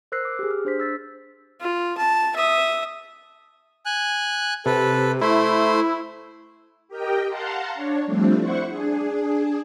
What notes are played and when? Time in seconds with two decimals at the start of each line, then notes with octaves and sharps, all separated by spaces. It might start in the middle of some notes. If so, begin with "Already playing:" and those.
0.12 A#4 C5 E6 F#6 A#6 C7
0.25 D6
0.39 G4 G#4
0.51 F6
0.65 D4 C5 B6
0.80 E6 A6 B6
1.61 F4
1.98 A5
2.36 E5 D#6
3.86 G#5 F#6
4.66 C3 A4 B4
5.21 A3 E4 C5
6.88 G4 A#4 D#5 G5
7.27 F5 F#5 A5 A#5 C6
7.74 D4 C#5
8.05 F3 G3 A3 C4 D4
8.37 E4 C5 F#5 C#6
8.69 D4 G#4